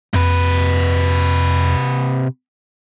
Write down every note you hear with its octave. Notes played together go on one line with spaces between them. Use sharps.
F2 C3 B4